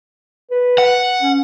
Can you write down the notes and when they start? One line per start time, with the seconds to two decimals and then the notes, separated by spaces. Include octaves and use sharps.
0.51 B4
0.78 F#5
1.22 C#4